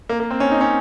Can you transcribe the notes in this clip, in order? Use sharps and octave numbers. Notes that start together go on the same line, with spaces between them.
A#3
A#3
C4
C#4
D#4
C#4